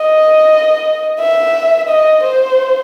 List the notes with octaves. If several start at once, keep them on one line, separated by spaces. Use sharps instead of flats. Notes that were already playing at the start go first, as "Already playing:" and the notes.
Already playing: D#5
E5
D#5
C5